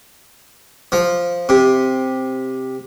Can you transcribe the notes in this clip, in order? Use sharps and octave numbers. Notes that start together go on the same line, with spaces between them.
F3
C3